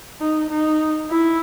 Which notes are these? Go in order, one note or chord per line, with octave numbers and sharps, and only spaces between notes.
D#4
D#4
E4